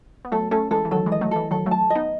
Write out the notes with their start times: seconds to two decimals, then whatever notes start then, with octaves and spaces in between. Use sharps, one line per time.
0.25 B3
0.32 F#3 A3 A4
0.51 A3 C#4 A4
0.71 E3 G#3 A4
0.85 E3
0.91 D#3 F#3 A4
1.06 E3 G#3
1.12 D#5
1.21 F#3 A3
1.31 E3 A4
1.51 D#3 F#3 A4
1.66 F#3 A3
1.71 A5
1.90 D#5
1.95 B3 D#4